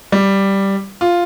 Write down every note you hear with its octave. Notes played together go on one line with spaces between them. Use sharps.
G3
F4